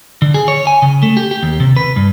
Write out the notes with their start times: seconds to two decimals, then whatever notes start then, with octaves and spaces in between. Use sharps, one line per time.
0.22 D3
0.34 G#4
0.48 C#5
0.67 G#5
0.82 C#3
1.03 A3
1.17 G4
1.31 G4
1.43 D#2
1.60 C3
1.76 B4
1.96 G2